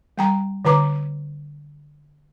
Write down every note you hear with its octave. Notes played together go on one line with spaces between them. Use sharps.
G3 G5 A#5
D3 B4 A#5 D6